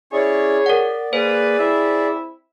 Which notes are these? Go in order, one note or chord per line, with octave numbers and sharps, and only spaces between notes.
C#4 E4 G#4 C#5 D5
A#4 D5 F#5
A#3 G#4 B4 C5 D5
C4 E4 E5